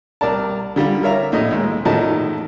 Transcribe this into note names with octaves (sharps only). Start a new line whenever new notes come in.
C2 A#4 D5 A5
D3 G3 F4 G4
A#4 C#5 E5 F5 A#5
A#1 A2 D#5
D#2 G#3
E2 A2 D#3 F3 D#5 A5